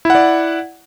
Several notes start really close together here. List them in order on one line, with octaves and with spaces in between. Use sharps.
E4 F#5 D5